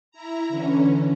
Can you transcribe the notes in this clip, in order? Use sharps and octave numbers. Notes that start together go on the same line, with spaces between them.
E4 A#5
D3 E3 C#4